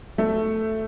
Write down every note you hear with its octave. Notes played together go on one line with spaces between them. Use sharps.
A3